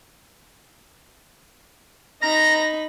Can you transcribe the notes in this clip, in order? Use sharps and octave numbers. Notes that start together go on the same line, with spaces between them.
D#4 A#5 B5 A#6